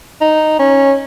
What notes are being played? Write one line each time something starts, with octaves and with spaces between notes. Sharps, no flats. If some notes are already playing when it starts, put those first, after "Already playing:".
D#4
C#4